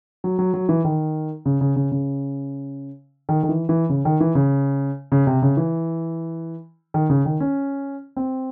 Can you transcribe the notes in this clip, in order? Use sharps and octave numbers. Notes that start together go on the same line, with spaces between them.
F#3
F#3
F#3
E3
D#3
C#3
C#3
C#3
C#3
D#3
D#3
E3
E3
C#3
D#3
E3
C#3
C#3
C3
C#3
E3
D#3
C#3
D#3
C#4
C4